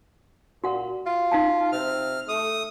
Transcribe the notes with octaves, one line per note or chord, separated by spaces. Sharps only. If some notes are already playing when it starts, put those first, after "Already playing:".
A#2 F#4 F#5
F4
D#4 F5 A5
C3 F6
A3 D#6